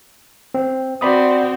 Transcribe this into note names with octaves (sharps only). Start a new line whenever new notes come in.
C4
C4 F#4 D5 B5 D#6